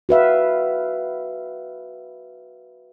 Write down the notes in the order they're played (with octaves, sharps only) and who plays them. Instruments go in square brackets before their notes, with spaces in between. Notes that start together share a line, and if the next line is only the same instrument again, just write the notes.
[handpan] F#4 B4 E5 F5